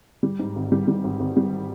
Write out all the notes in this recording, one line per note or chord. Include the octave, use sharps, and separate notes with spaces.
G3
G#2
G#1
G3
G3
G#1
G#1
G3